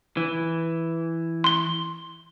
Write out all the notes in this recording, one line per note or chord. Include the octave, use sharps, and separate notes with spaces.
E3
C6 G7